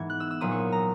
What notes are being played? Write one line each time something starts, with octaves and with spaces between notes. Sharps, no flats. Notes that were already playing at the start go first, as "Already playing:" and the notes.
Already playing: G#2 E3 B3 G#6
F#6
E6
E6
A#1 A#2 F#3 D#6
C#6
A#5